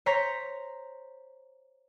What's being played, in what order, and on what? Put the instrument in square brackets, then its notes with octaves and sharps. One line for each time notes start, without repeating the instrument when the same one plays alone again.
[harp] C5 C#5 A#5 B6